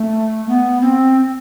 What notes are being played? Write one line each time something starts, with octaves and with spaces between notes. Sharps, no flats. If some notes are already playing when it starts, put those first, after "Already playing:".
Already playing: A3
B3
C4